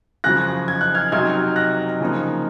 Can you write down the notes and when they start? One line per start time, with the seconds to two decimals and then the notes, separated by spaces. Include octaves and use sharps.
0.24 F#2 C#3 F3 F#6 A#6
0.68 G#6
0.81 F#6
0.94 F6 G#6
1.12 C3 F#3 C4 D#4 F6 G#6
1.56 F#6 A#6
2.01 C#3 F3 A#3 D#4